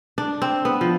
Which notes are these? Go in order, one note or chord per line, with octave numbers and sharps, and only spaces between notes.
D4
C4
B3
F3